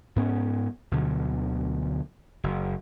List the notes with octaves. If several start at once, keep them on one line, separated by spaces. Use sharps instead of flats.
G#2 B3 C#4
D2 B2 D3 F#3
F#1